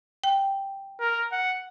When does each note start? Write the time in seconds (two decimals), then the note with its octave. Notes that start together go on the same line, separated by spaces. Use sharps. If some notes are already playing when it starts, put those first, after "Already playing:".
0.24 G5
1.00 A#4
1.32 F#5